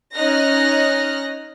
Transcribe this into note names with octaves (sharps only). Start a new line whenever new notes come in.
C#4 D#4 D#5 F6 F#6 A#6